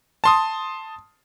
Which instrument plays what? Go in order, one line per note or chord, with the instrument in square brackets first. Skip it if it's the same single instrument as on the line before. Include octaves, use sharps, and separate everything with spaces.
[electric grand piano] A5 C6 D#6